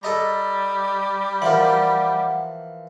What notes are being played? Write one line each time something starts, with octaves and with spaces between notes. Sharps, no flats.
G3 A4 D#5 A#5
E3 F3 A#4 F#5